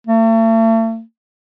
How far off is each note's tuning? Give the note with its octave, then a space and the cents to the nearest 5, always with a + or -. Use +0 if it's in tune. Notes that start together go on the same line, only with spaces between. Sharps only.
A3 +40